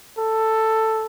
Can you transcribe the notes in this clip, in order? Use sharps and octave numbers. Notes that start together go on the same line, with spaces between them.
A4